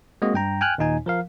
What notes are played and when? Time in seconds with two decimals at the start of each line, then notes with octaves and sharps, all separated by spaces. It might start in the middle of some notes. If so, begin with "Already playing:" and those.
0.22 G#3 A#3 C4 F#4 D#5
0.34 G2 G5 A#5
0.61 G5 G#5 F6 F#6
0.78 D#2 A#2 D#4 G#5
1.06 F3 A#4 F5